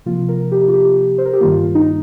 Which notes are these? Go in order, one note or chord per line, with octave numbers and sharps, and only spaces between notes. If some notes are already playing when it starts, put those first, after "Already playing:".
C3 F3 A#3 F4
A#4
G4
F4
G4
C5
A#4
G4
G2 D#3 G3 A#3 F4
D#4